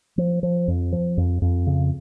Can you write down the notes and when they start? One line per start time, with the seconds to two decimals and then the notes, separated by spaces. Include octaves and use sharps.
0.18 F3
0.43 F3
0.68 F2
0.92 F3
1.17 F2
1.42 F2
1.67 C#3